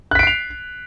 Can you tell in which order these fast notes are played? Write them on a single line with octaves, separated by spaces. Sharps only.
F#6 B6 D7 C7 F7